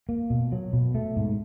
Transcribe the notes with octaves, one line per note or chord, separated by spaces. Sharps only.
A#3
B2
F#3
B2
A3
G#2